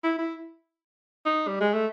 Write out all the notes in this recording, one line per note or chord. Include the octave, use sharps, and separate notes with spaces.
E4
E4
D#4
G3
G#3
A3